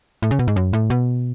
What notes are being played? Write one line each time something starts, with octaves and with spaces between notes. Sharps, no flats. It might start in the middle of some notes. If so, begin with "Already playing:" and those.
A2
C#3
B2
G#2
F#2
A2
B2